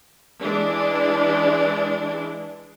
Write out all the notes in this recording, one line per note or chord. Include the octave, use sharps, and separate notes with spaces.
E3 G#3 D4